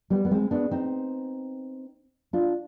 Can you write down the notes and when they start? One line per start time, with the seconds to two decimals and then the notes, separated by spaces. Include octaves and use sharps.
0.10 G3 B3
0.25 B3
0.31 G#3 C4
0.51 B3 D4
0.71 C4 D#4
2.33 D4 F4